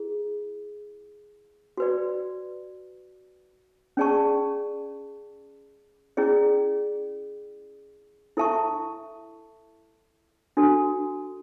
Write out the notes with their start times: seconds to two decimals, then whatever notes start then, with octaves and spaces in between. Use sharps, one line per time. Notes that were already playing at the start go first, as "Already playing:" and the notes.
Already playing: E4 G#4
1.77 F#4 B4 D5
3.97 C#4 G#4 D5 A5 C#6
6.17 C#4 E4 G#4 D5
8.37 E4 A4 E5 A5 C#6
10.57 D4 F#4 A4